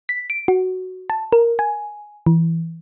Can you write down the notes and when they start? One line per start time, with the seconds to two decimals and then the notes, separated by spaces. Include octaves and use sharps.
0.09 B6
0.30 D7
0.48 F#4
1.10 A5
1.33 A#4
1.59 G#5
2.26 E3